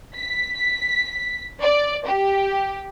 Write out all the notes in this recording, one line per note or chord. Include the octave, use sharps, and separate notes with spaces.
B6
D5
G4